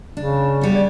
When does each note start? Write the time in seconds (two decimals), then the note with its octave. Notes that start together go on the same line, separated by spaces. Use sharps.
0.17 C#3 D4
0.61 G3 B3
0.75 D5